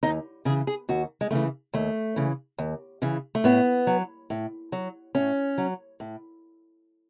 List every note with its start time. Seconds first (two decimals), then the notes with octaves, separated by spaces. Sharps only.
0.03 D#2 D#4
0.45 C#3 E3 G#4
0.67 G#4
0.89 D#2 F#4
1.21 G#3
1.31 C#3 E3 A3
1.74 D#2 A3
2.16 C#3 E3
2.58 D#2
3.02 C#3 E3
3.35 A3
3.44 A2 B3
3.87 F#3
4.30 A2
4.72 F#3
5.15 A2 C#4
5.58 F#3
6.00 A2